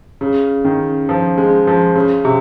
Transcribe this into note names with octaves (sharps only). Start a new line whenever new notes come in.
C#3
D#3
F3
G#3
F3
C#3
C3